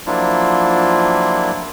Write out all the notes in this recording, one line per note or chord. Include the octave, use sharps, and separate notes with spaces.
F3 F#3 A#3 D4 E4 F4